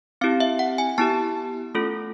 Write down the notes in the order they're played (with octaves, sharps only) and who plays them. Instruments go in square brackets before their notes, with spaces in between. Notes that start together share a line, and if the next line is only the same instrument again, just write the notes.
[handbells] C4 E4 G4 F5
E5
F#5
G#5
B3 E4 G4 A5
A3 C#4 F4 A4